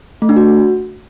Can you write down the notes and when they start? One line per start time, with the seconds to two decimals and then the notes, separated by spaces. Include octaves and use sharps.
0.22 A3
0.29 D4
0.36 F#4